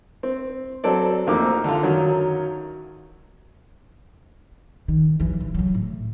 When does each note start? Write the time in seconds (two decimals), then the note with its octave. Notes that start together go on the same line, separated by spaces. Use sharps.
0.23 C4
0.84 F#3 C4 A4 D5
1.27 A1 F2 A#3 D#4 D6
1.64 D3 F4
1.83 F#2 D#3 F#3
4.88 D#3
5.20 F#2 E3
5.40 D#1
5.55 C#3 F#3
5.75 A2